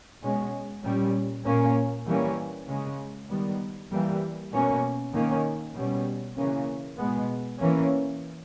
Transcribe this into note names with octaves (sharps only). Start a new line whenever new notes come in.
B2 G#3 C#4
A#2 G3 C#4
A#2 A#3 C#4
E3 G3 A#3 C#4
C#3 G#3 C#4
D#3 G3 B3
E3 G3 A#3
B2 A#3 C#4
D#3 A#3 C#4
B2 G3 C#4
C#3 E3 A#3 C#4
B2 G#3 B3
E3 A#3 C#4